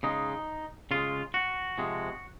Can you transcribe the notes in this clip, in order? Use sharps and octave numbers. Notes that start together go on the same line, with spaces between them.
C#3 G#3 D#4
C#3 G#3 F4
F#4
C3 F3 G#3